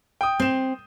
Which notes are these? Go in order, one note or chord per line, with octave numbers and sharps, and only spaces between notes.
G5 D#6
C4 G6 E7